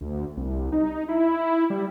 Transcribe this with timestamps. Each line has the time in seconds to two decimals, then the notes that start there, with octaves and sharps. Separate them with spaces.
0.01 D2
0.37 C2
0.72 D#4
1.08 E4
1.70 G3